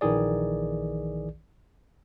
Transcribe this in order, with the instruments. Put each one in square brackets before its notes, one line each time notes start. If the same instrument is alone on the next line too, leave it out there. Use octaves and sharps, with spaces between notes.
[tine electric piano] A#1 D#3 E3 G#4 D5